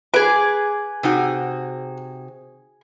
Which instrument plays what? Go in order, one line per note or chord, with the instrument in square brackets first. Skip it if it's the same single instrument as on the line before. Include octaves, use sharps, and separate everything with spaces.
[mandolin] G#4 D6 [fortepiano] B4
[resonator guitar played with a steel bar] C3 D#4 F#4